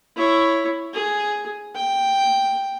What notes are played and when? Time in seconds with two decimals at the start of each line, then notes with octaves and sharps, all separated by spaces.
0.16 E4 C#5
0.94 G#4
1.76 G5